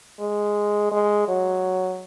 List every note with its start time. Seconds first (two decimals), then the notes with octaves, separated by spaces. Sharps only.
0.20 G#3
0.92 G#3
1.28 F#3